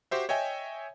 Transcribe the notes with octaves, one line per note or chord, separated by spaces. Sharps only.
F#4 G4 C5 E5
C#5 D#5 E5 G5 G#5